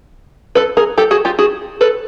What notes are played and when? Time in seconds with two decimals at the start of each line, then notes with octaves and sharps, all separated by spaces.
0.55 A4 B4
0.77 G#4 A#4
0.98 G4 A4
1.11 F#4 G#4
1.25 F4 G4
1.39 F#4 G#4
1.81 A4 B4